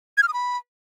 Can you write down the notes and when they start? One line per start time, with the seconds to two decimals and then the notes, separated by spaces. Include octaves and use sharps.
0.18 G#6
0.23 F6
0.28 D#6
0.34 B5